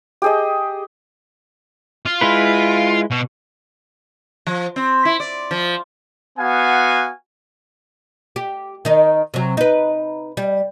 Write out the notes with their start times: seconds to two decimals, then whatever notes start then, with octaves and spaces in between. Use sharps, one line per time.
0.22 G4 G#4 D#5
2.06 F4
2.21 G#3 E4 B4
3.11 B2
4.47 F3
4.76 C4
5.05 E4
5.20 D5
5.51 F3
6.39 B3 F#4 F5 F#5 G#5
8.36 G4
8.85 D#3 D#4
9.34 C3 F#3
9.57 D#4 B4
10.37 G3